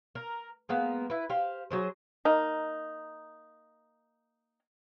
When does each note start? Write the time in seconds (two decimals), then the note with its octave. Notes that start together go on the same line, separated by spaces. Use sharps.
0.15 A#4
0.69 G#3 A#3 B3
1.10 E4 B4
1.30 G4 C5 F5
1.71 F#3 G#4 C5
2.25 A#3 D#4